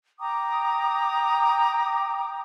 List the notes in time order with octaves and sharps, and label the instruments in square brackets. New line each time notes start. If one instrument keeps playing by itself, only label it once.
[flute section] G5 A#5 D6 D#6